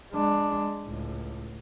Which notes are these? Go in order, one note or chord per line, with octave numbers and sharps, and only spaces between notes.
G#3 D4
C#2 A2